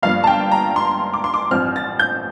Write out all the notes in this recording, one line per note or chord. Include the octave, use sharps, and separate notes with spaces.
G1 G2 F3 A#3 F5
A5
G5
A#5
C6
D6
C6
D6
A1 G2 F3 C4 F6
A6
G6